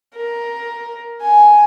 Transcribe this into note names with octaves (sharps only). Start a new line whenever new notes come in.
A#4
G#5